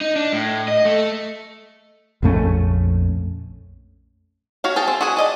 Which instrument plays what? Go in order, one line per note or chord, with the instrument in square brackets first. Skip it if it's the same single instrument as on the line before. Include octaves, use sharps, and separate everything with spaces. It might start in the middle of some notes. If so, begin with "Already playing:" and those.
[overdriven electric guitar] D#4
D4
A2
D#5
A3
[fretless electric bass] A#1 F2 A3 C#4
[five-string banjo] F#4 C#5 F5
G#4 G5 A5
C4
F#4 G#4 F#5 G#5
D5 D#5 A5